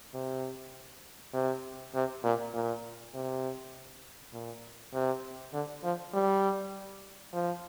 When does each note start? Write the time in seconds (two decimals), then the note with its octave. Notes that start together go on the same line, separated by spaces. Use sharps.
0.14 C3
1.34 C3
1.95 C3
2.24 A#2
2.54 A#2
3.14 C3
4.33 A#2
4.93 C3
5.53 D3
5.84 F3
6.14 G3
7.33 F3